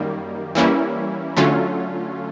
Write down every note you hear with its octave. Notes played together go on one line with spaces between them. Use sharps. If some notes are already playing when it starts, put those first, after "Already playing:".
Already playing: F#2 D#3 G3 A#3
E3 G3 A#3 C#4 E4
D3 F#3 A3 C#4 F4